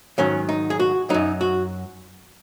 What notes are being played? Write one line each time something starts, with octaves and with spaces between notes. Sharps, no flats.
G#2 D#3 F#3 C#4
D#4
G#4
F#4
F#2 F#3 D#4
F#4